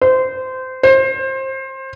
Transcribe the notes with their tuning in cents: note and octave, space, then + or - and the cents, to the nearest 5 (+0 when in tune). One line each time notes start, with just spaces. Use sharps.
C5 -20
C5 +25